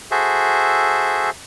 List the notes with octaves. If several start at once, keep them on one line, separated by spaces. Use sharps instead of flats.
F#4 G#4 A4 C5 E5